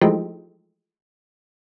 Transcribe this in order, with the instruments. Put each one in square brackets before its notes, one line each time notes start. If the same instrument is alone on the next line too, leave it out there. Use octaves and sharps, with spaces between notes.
[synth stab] E3 F3 G#3 A3 D#4 G4